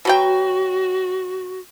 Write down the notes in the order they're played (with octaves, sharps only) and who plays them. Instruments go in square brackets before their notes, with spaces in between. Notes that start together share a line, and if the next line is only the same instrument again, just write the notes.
[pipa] B2 F#3 G5 [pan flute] F#4